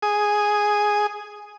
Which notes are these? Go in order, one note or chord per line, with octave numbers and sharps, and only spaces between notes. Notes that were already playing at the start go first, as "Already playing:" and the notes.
G#4 D#6